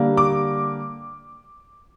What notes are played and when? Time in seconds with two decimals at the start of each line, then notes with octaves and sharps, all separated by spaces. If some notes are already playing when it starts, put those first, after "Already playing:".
Already playing: D3 G3 A#3
0.17 D6